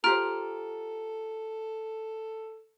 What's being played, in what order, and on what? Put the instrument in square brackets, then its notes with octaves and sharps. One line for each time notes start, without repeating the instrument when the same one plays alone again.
[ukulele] F4 G4 C5 [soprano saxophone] A4 [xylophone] A#5 F6 D7